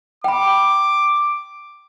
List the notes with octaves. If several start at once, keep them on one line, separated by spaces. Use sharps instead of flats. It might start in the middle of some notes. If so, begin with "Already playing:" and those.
G5 B5 D6